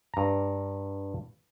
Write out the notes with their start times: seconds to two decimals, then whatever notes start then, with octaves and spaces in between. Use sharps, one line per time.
0.14 G2 A#5